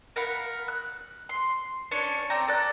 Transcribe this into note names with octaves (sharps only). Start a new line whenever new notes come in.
A#4 F5 F#5 B5
F#6
C6
C#4 D4 C#5 C#6
C4 D5 G5 A#5
A4 D5 F#6